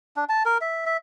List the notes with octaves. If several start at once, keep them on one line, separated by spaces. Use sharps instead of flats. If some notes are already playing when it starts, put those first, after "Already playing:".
D4
A5
A#4
E5
E5